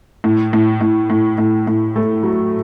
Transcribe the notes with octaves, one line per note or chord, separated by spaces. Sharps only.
A2
A2
A2
A2
A2
A2
A3
F#3